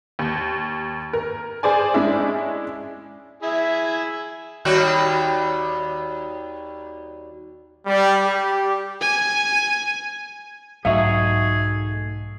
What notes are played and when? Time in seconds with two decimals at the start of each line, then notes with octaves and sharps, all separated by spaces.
0.19 D#2
1.13 A#4
1.63 G#4 C5 D5 G#5
1.94 G#3 C#4 D4 E4
3.43 E4 G#4 E5
4.65 D#2 G3 F#4
7.86 G3
8.26 G4
9.01 G#5
10.85 B1 G#2 F#3 A3 D#4 F#4 G#4 E5